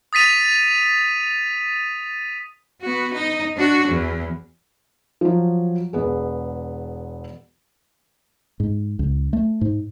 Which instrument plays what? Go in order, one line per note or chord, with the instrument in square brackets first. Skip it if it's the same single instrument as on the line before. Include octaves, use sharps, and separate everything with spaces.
[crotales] D#6 A6 B6 D#7 F7
[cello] B3 F#4
D#4
D4 F#4
E2
[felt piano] F3 F#3
E1 B3 G#4
[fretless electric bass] G#2
C#2
A3
G#2